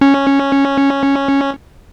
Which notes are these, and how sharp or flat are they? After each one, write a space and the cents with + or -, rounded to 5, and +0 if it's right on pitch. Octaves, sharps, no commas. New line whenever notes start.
C#4 -5